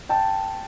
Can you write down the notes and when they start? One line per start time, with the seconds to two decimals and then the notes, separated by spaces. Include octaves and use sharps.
0.09 G5 A5